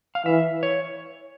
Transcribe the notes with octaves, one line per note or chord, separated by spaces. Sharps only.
F5
E3 E5
C#5